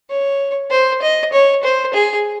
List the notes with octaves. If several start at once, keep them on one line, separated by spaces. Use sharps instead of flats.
C#5
C5
D#5
C#5
C5
G#4